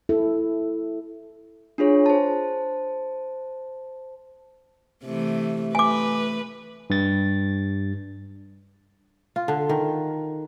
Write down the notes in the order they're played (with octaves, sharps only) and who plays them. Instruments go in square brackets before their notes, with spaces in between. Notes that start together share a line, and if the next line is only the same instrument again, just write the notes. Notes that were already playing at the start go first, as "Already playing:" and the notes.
[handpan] E4 A4
[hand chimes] D4 F4 G#4 C#5
C5 A5
[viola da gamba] C3 E3 A3
[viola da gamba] A3 B4 [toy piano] G#5 D6
[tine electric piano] G2 A6
[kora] F4
D3
D#3